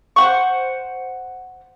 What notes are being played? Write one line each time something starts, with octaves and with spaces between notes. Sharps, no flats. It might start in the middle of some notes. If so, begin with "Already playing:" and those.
C5 F#5 C#6